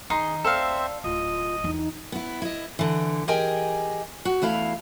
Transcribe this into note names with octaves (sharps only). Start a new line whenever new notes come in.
D#3 D#4 G#4 C6
D2 C4 A4 C5 D5 E5 F5
D1 F4 D#5
E2 D4 D#4
B3 E4
E4 D#5
D3 E3
G4 G#4 A#4 D#5 G5 G#5
F#4
E2 A3 E4 F5